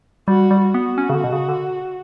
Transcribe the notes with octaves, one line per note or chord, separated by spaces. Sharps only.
G3 F#4
G3
F#4
B3
C#4
C#3
D3
B2
C#3
D3